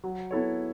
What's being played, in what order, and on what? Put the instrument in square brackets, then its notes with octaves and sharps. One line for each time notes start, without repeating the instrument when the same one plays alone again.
[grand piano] F#3
B3 E4 A4 C#5